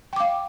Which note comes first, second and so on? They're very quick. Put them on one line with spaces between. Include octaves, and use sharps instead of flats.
G5 D6 F5